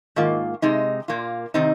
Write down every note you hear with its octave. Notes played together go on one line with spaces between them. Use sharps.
G#2 D#3 A#3 F4
C3 G#3 D#4
A#2 A#3 F4
C3 D#3 C4 D#4